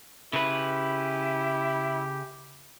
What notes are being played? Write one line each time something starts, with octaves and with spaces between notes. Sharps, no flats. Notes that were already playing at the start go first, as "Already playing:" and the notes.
C#3 E4 G4 B4